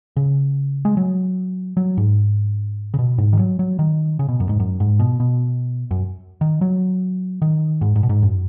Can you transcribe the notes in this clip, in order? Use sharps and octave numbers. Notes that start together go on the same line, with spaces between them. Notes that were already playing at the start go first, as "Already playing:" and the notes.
C#3
G#3
F#3
F#3
G#2
C#3
B2
G#2
D#3
F#3
F#3
D#3
C#3
B2
F#2
G#2
F#2
G#2
B2
B2
F#2
D#3
F#3
D#3
G#2
G#2
B2
G#2
F#2